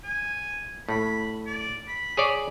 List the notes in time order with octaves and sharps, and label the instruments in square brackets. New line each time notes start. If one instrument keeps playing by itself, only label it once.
[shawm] G#5
[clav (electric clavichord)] A2 [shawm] B5
[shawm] D5
B5
[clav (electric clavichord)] G#4 C#5 D5